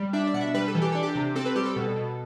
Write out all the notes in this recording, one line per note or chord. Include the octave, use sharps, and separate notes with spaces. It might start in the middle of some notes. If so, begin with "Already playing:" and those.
Already playing: G3
D4 E5
D5
B2 F#5
E5
G3 B4
A4
E3
G4
D4 A4
G4
C3
C4 A4
B4
G3 G4
A4
B2
B2